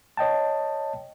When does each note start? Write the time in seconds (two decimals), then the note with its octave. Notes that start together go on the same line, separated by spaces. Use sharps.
0.17 C#5 D#5 G5 A5